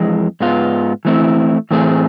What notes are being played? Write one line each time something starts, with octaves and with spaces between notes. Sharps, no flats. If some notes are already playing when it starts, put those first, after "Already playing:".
Already playing: F2 E3 G#3
G#2 G#3 B3 F4
E3 A3 C4 E4
A2 E3 A3 C4 G#4